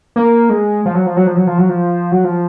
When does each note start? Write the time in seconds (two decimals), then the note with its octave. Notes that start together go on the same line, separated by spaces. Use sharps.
0.16 A#3
0.50 G#3
0.86 F3
0.95 F#3
1.06 F3
1.17 F#3
1.27 F3
1.37 F#3
1.47 F3
1.58 F#3
1.69 F3
2.12 F#3
2.24 F3